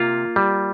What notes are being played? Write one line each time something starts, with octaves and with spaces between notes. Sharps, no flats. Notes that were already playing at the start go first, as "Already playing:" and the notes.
Already playing: C3 A#3 F4
G3